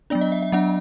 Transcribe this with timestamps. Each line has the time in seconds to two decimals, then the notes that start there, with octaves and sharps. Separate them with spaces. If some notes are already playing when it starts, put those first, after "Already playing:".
0.10 F#3 B3 D4 D5
0.21 D#5
0.32 E5
0.42 E5
0.52 F#3 B3 D4 F#5